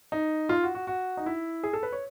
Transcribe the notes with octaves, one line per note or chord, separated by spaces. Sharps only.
D#4
F4
F#4
F#4
F#4
D#4
E4
G#4
A4
B4
C#5